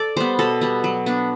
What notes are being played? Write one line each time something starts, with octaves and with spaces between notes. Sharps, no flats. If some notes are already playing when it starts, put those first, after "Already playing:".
Already playing: A4 D5
G3 B3 C5
B2 A4
G3 B3
F#3
B3 D4